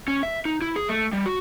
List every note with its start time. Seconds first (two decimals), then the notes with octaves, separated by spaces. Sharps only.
0.08 C#4
0.23 E5
0.45 D#4
0.62 E4
0.76 G#4
0.88 A3
1.13 G3
1.26 F#4